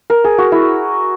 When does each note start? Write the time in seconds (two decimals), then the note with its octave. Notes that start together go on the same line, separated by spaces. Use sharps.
0.10 A#4
0.24 G#4
0.38 F#4
0.52 E4